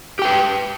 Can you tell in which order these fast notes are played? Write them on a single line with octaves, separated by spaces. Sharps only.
G4 G5 B4